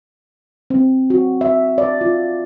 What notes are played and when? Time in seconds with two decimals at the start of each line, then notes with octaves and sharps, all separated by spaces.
0.70 C4
1.10 F#4
1.41 E5
1.78 D5
2.01 F4